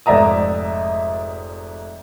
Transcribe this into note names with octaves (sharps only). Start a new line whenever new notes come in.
F1 G#2 D5 E5 A#5 D#6